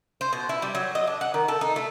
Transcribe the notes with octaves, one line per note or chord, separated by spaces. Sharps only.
C5
B2
E4
G3
F#3
D#5
D4
F#5
D#3
A4
D#4
A3